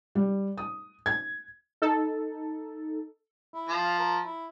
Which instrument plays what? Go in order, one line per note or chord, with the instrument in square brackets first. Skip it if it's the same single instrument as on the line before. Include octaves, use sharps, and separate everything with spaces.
[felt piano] G3
D#6
G#6
[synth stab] D#4 A4
[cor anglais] E4
[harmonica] F3
[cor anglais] F5
A#4
E4